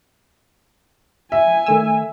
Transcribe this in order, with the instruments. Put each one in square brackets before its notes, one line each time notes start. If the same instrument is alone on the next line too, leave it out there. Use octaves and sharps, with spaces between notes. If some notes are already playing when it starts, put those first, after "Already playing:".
[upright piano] E5 [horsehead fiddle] G#5
[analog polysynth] D#3 A3 E6